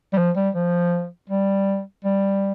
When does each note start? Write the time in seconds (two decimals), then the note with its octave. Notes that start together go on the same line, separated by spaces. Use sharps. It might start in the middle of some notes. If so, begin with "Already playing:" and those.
0.13 G3
0.18 F3
0.36 G3
0.55 F3
1.29 G3
2.04 G3